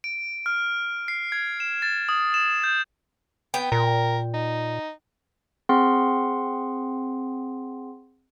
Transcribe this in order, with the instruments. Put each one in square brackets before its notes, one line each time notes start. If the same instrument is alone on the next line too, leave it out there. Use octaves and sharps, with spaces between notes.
[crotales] D7
F6
C7
G#6
E7
A6
D#6
E7
G6
[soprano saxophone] B3 [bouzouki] G5
[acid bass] A#2 [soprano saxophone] A#4
[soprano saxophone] D#4
[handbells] C4 G#4 F#5 C6